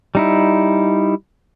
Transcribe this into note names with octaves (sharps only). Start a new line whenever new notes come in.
G3 D#4 E4